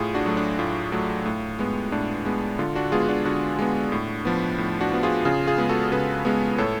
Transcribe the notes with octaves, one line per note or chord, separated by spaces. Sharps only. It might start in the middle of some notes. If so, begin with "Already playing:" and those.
Already playing: A2 F4 G#4
D4 F#4
F#3 A3
D4
A2 F4
F#3 A3
A2
G#3 B3
A2 D4
G#3 B3
D3 F4
D4 F#4
G#3 B3 F4 G#4
D4 F#4
D3 D4 F#4
G#3 B3
A2
F3 B3
A2
D4 F#4
F3 B3
F4 G#4
C#3 F4 G#4
F4 G#4
G#3 B3
F#4 A4
C#3 G#4 B4
G#3 B3
A2 A4 C#5